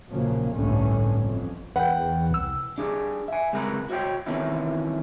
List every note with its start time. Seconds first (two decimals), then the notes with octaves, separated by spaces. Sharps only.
0.10 A#1 C#3 F3 F#3 A#3
0.55 G1 C2 A2 D3 C#4
1.22 A1 F2
1.76 E2 B4 F#5 G5
2.31 C2 E6
2.78 D4 G4 G#4
3.28 E5 G#5
3.53 C#2 C3 G#3 A#4 B4 B5
3.90 F#4 C5 C#5 E5 G5
4.26 C3 D#3 E3 B3 C#4 E4